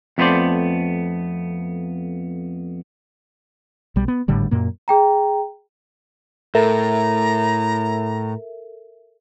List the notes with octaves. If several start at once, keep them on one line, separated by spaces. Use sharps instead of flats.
F2 A3 B3 D4 C5 D5
B1 G3
B3
G#1 A2 D3 G3
F#2 A#2 A#3
G#4 G5 A#5
A2 A4 A#4 E5 A#5